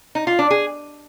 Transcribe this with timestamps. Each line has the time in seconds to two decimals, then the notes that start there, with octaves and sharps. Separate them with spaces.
0.15 D#4
0.27 F4
0.39 D4
0.51 G#4